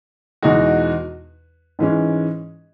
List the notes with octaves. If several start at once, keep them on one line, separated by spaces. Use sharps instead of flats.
E2 B2 G#3 D#4 F#4
G#2 E3 G#3 C#4